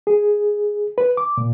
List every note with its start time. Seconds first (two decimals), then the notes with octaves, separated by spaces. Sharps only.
0.07 G#4
0.98 B4
1.17 D6
1.37 A#2